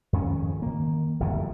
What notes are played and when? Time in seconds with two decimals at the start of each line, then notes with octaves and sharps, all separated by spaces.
0.13 F2 G#2 D#3 C#4
0.62 D#3 A#3
1.20 G1 F2 A2 D#3